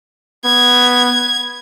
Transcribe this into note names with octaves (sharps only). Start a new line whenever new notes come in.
B3 G#6